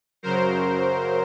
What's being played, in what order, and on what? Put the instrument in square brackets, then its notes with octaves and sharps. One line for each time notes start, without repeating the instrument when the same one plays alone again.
[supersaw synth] F#2 C#3 F#3 A#4 C5